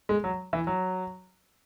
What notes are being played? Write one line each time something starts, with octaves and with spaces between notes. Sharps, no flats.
G#3
F#3
E3
F#3